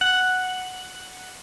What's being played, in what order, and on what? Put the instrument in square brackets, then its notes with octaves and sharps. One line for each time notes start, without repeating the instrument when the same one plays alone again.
[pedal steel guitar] F#5